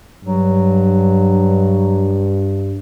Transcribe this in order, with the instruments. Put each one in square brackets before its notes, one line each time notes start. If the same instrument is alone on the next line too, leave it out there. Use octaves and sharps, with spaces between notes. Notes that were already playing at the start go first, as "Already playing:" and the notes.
[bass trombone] G2 [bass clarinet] F#3